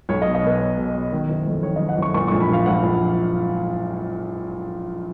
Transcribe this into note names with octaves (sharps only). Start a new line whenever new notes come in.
B1 C#5
B2 D#5
D#5
B2 B4
B2 C#5
B2
B2
D#3
F#1
F2
D#3 C#5
D#5
F#1
F#5
F#1 C#6
A#2 C#6
A#1 C#6
B5
A#2 F5
A#1 F#5
A#1